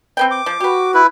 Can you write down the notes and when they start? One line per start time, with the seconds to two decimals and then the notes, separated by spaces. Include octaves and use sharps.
0.17 C4 B4 G5
0.31 D6
0.46 F3
0.60 F#4 G4 B4
0.94 E4 B4